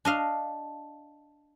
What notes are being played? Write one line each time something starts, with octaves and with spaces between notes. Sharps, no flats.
D4 D#5 F5